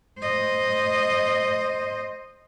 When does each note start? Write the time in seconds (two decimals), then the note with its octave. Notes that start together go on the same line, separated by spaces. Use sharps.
0.19 C5 D#5